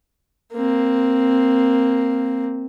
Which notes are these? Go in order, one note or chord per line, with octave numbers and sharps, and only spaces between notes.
A#3 C4